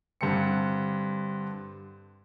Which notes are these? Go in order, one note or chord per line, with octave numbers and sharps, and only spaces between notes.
G2 D3 C4 C#7